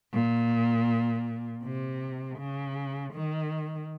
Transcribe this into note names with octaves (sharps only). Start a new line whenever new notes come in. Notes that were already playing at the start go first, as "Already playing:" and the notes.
A#2
C3
C#3
D#3